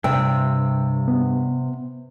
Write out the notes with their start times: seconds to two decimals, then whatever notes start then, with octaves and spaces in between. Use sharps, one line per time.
0.04 G2 C3 G5 E6
1.08 B3